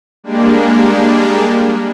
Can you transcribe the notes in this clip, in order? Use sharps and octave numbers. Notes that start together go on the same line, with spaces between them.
G3 G#3 A#3 D4